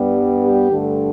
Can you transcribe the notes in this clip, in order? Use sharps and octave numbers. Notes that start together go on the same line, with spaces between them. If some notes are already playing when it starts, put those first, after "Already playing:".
Already playing: G2 G3 B3
G4
G2 D3 A3